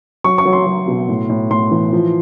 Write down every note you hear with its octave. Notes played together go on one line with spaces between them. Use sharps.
F#3 C#6
C#6
F#3
C6
F#3
B2
A2
A2
A2 C6
E3
F3